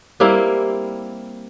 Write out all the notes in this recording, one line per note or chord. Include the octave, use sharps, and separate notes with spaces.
G3 A#3 C4 E4